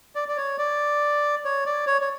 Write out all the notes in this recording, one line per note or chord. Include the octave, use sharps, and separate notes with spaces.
D5
D5
C#5
D5
C#5
D5
C#5
C#5